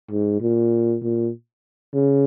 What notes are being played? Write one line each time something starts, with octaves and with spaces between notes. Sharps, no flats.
G#2
A#2
A#2
C#3